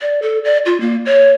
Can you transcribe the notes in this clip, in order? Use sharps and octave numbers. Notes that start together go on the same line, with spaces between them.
D5
A4
D5
F4
A#3
C#5